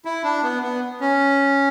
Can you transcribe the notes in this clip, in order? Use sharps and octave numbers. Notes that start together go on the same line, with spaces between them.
E4
D4
B3
B3
C#4